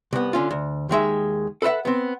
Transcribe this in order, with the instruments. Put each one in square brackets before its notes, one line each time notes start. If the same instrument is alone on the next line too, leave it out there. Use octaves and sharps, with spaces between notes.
[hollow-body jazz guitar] C2 B3
D3 C#4 F4
D2
D#2 D#3 G#3 E5
A4 B4 C5 E5 F#5
B3 C4